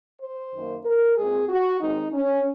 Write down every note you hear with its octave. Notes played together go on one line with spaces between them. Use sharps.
C5
F#2 D#3 A#3
A#4
A#2 G#3 C4 G#4
F#4
D#2 D#3 G#3 C4 D#4
C#4